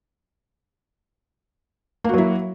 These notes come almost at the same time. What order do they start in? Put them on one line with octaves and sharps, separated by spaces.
A#3 F#4 F#3 E4